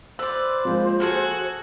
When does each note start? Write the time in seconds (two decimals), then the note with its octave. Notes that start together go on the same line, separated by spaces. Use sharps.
0.19 B4 C5 D5 E6
0.65 F3 G#3 A#3
1.00 F#4 G#4 A4 G#5 F6